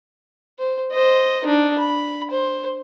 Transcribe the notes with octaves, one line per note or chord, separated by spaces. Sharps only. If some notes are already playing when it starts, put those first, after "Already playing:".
C5
C5 D#5
D4 D#4
B5
C5